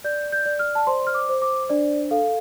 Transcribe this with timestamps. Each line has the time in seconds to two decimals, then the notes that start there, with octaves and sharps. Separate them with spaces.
0.04 D5 G6
0.32 G6
0.46 D5
0.59 F6
0.75 A5
0.87 C5 C6
1.07 F6
1.14 D6
1.29 C5
1.42 D6
1.70 D4 D5
2.11 A4 F5